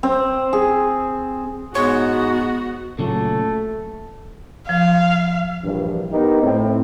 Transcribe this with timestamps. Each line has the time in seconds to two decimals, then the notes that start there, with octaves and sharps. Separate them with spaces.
0.03 C4
0.53 G#4
1.75 G#2 G#3 B3 F#4 C#5
2.99 A#2 C#3 F#3 A3
4.69 F3 F5
5.64 A#1 G2 E3 F3
6.12 B3 D#4 G4 A#4 B4
6.42 A2 C4